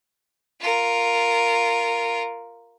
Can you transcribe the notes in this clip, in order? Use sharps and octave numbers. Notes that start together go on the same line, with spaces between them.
F4 A#4